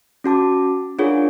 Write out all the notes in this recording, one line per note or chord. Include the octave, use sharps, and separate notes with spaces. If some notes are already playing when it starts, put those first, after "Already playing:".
C#4 F#4 A5 D6
D4 F4 G#4 A#4 C#5 F#5